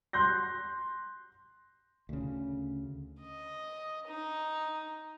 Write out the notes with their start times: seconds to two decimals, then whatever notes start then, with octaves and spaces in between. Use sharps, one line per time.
0.13 C6 F#6 G6 A#6
2.09 D2 C#3
3.21 D#5
4.08 D#4